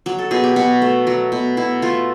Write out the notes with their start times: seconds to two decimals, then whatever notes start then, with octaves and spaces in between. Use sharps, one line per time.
0.06 F#3
0.19 A4
0.31 B2 G#4
0.44 G4
0.56 B2 F#4
0.82 A3
1.07 F#3
1.32 B2
1.57 B2 E4
1.82 A3 F4